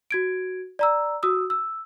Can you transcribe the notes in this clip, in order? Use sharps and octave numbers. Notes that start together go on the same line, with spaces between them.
F#4 G#6 D7
D5 A#5 E6
F#4 D#6 E6
E6